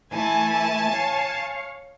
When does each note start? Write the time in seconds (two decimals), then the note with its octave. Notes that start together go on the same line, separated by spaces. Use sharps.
0.13 E3 A3 E4 G#5 A5
0.91 C#5 F5